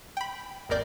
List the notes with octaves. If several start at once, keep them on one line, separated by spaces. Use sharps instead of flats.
G5 B5
G#1 D#2 A#4 D5 G6